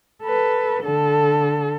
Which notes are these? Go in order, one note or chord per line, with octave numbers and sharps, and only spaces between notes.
A4 B4
D3 A4